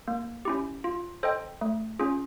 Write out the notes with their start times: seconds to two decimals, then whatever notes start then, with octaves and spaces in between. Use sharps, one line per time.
0.08 A#3
0.45 C#4 E4 G4
0.84 F4
1.23 A4 C5 D#5 G5
1.61 A3
1.99 C#4 F4 G#4